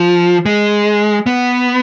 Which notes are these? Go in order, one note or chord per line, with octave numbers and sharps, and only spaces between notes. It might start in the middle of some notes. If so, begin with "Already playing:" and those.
Already playing: F3
G#3
B3